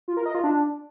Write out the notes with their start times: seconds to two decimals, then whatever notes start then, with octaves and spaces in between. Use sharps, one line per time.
0.08 F4
0.17 A#4
0.26 D#5
0.35 F4
0.44 D4